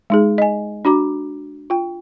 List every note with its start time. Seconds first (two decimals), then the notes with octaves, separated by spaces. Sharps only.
0.10 G#3 D#4 G#4
0.38 D#5 G#5
0.85 D4 F#4 A#5 D6
1.70 F4 G5